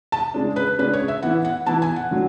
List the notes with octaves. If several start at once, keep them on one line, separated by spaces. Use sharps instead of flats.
A5
C#3 G#3 D4
B4
C#3 G#3 D4 B4
C#5
E5
E3 B3 E4 F#5
F#5
E3 B3 E4 A5
G#5
F#5
D3 F#3